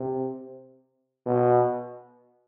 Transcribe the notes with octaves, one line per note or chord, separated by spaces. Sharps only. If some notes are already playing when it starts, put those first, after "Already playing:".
Already playing: C3
B2